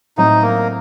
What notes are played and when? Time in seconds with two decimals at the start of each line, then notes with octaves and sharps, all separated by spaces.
0.17 A2 F#3 A3 C4 D#4
0.42 A#3